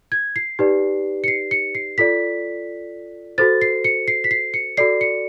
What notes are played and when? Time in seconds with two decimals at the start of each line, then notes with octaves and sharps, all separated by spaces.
0.12 G#6
0.36 C7
0.59 D#4 G4 B4 D5
1.24 C#7
1.28 C7
1.51 C#7
1.75 C7
1.98 F4 A4 D5 B6
3.38 F#4 A4 C5 A6
3.61 C7
3.84 C#7
4.08 C7
4.24 B6
4.31 C7
4.54 C#7
4.77 F#4 A4 D5 C7
5.01 C#7